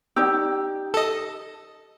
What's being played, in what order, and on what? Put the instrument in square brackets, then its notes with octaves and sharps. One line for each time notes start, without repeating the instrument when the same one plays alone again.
[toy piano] C#4 D5 E6 [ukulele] D#4 G4
[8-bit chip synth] A4 D#5